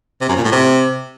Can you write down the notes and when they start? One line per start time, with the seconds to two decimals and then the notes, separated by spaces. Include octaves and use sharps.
0.21 C3
0.29 F#2
0.37 A#2
0.44 A2
0.52 C3